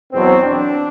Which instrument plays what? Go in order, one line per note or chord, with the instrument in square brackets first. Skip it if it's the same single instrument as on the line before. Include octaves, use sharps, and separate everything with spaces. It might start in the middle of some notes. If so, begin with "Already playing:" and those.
[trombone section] E2 B2 F#3 C4
D4